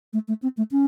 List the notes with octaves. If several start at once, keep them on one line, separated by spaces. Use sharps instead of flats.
A3
A3
C4
A3
C#4